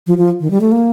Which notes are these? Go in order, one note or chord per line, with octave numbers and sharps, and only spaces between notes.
F3
F3
D#3
G3
A3
A#3